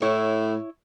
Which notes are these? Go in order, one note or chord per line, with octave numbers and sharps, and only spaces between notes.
A2 E4 C#5